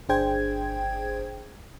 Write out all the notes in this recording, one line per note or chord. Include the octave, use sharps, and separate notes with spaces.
G1 D4 G#4 C5 G5 G#6